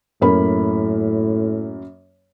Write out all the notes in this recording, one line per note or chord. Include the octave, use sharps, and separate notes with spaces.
F#2 A2 A#3 B5